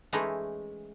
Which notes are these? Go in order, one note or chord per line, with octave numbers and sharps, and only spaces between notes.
E3 G#3 A3 C#4 D#4 E4